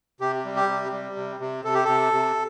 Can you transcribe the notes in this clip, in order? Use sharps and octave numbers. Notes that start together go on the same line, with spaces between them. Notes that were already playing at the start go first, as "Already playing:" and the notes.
C3 G4
G3
G4
C3
G3
C3
C3
C3 A4
G4
C3 A4
C3